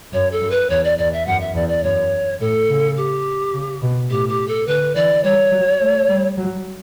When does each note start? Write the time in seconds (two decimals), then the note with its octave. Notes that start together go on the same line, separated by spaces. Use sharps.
0.13 F#2 C#5
0.31 A4
0.42 F#2
0.50 B4
0.70 E2 C#5
0.84 D5
0.98 E2 D5
1.13 E5
1.27 F#2 F#5
1.40 E5
1.54 E2 D5
1.68 D5
1.83 F#2 C#5
2.40 A2 A4
2.69 C#3
2.96 G4
3.54 C#3
3.82 B2
4.10 A2 G4
4.29 G4
4.48 A4
4.67 D3 B4
4.95 E3 D5
5.24 G3 C#5
5.52 F#3
5.81 A3
6.09 G3
6.37 F#3